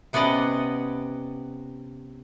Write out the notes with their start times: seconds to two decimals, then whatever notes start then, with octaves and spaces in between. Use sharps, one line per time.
0.13 C3 B3 C#4 D5 D#5 F#5